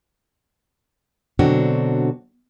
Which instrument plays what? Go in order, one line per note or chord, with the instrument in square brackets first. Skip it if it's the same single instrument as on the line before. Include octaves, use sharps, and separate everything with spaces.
[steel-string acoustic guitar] B2 D3 F#3 C4 D4 F#4